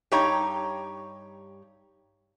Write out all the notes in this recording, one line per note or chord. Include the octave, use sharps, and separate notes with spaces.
G2 D#4 G4 C#5 A#5